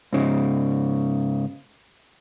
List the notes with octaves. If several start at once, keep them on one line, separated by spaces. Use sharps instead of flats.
G#2 C#3